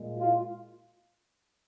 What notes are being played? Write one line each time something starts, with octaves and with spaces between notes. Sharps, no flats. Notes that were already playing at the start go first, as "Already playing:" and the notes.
Already playing: A#2 G#3
F4